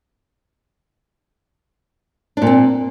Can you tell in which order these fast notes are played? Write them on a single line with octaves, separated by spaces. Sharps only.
D4 A#2 C4